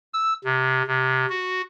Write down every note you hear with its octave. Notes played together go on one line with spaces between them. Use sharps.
E6
C3
C3
F#4